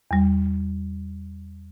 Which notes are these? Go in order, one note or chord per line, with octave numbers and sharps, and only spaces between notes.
E2 G3